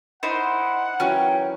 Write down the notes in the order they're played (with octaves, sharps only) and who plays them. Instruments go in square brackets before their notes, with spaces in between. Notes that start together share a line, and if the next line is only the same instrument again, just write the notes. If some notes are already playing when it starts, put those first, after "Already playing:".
[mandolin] D#4 E4 C5 [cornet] F#5
[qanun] E3 F#3 A#4 [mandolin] C#4 [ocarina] G5